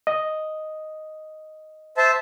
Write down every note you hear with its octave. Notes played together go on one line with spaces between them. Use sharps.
D#5
C5 E5 A5